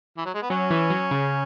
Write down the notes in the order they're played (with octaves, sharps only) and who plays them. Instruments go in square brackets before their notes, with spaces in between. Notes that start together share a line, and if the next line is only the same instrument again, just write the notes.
[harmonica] E3
F#3
G#3
B3
[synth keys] F#3 [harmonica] C#4
[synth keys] E3
F#3
C#3